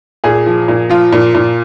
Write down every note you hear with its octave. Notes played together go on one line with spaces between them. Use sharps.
A#2 G#4
F3
A#2
F3 F4
A#2
A#2